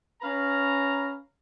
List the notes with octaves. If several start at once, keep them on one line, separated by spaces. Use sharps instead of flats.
C#4 B4 F5 A#5